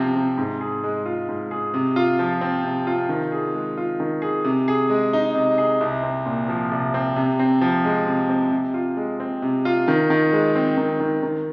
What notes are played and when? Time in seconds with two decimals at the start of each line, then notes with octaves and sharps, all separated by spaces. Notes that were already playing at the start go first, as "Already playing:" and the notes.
Already playing: C3 F3 C4
0.16 C3
0.37 G#2
0.61 G#4
0.84 G#3
1.06 F4
1.28 G#2
1.51 G#4
1.74 C3
1.96 F4
2.19 F3
2.41 C4
2.64 C3
2.87 F4
3.09 D#3
3.32 G#4
3.55 G#3
3.77 F4
4.00 D#3
4.22 G#4
4.44 C3
4.68 G#4
4.90 G#3
5.13 D#4
5.35 C3
5.58 G#4
5.81 C2
6.03 C4
6.26 A#2
6.48 F3
6.71 C2
6.94 C4
7.16 C3
7.39 C4
7.61 F3
7.85 G#3
8.06 C3
8.29 C4
8.52 C3
8.74 F4
8.97 G#3
9.20 C4
9.42 C3
9.65 F4
9.88 D#3
10.10 D#3
10.33 G#3
10.55 C4
10.77 D#3
11.00 D#3
11.23 D#3